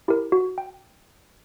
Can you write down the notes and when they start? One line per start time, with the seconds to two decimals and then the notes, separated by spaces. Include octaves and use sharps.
0.08 E4 G4 A#4
0.32 F#4
0.58 G5